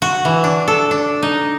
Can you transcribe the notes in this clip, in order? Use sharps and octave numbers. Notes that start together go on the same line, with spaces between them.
F#4
E3
D4
A4
D4
D#4